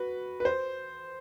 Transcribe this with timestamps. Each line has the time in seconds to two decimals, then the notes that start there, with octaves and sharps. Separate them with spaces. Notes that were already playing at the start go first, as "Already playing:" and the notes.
Already playing: F#4 B4
0.40 B4
0.45 C5